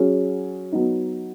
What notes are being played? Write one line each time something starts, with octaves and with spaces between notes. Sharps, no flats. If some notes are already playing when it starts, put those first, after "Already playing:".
Already playing: F#3 C#4 G#4
F#3 B3 D#4